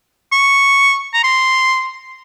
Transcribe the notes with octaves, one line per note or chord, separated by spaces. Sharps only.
C#6
A#5
C6